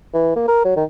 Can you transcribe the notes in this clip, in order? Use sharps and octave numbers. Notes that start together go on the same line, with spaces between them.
E3
A#3
A#4
F#3
D#3